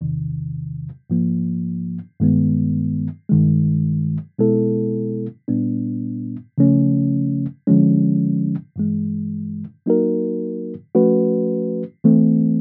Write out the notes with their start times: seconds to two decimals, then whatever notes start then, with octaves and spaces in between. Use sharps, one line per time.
0.01 E2 C3 D#3
1.10 G#2 F3 A#3
2.20 G2 D#3 G#3 B3
3.29 G2 D#3 G#3
4.39 B2 G#3 B3 E4 A4
5.48 A#2 G3 B3 D4
6.58 C#3 F3 A3 C#4
7.67 D3 F3 G#3 C#4
8.76 G2 E3 G#3
9.86 F#3 A#3 D#4 F#4 A#4
10.95 F3 A3 C#4 F#4 B4
12.04 E3 A3 C4